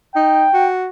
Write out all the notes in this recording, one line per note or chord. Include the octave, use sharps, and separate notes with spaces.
D#4 G5
F#4